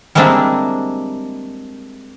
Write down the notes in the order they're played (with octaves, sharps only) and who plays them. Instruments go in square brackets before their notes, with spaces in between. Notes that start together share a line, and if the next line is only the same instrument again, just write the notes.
[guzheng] G3 G#3 A#3 C4 D4 E4